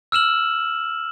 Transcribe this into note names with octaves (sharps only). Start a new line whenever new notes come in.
E6 F6 E7 F#7